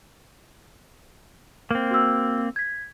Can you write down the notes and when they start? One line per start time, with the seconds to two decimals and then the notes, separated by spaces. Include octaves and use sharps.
1.71 A#3 C4
1.91 F#4 E6
2.56 G#6 B6